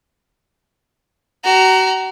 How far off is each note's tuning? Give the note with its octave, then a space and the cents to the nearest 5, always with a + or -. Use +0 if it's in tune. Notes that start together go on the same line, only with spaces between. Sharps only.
F#4 +35 A#5 -5